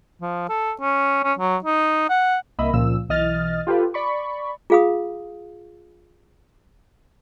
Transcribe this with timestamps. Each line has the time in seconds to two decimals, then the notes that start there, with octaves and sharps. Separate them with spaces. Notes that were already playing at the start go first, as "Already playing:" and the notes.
0.21 F3
0.49 A4
0.81 C#4
1.24 C#4
1.38 F#3
1.64 D#4
2.09 F#5
2.59 C2 A#3 D#5 E5 B5
2.73 C#2 A#2 F3 E6
3.09 B1 E3 D#5 F6 A6
3.67 F4 G4 A4 B4
3.94 D5 B5 C#6
4.70 F4 G#4 F5 B5 D#6